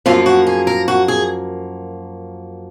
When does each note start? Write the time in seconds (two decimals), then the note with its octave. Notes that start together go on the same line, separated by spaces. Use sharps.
0.06 F#2 F3 A#3 F4
0.26 F#4
0.47 G#4
0.67 A#4
0.88 F#4
1.08 G#4